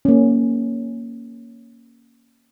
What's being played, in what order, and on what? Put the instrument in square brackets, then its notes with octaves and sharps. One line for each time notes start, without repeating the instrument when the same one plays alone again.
[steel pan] A#3 C#4